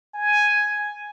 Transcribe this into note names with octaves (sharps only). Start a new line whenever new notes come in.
G#5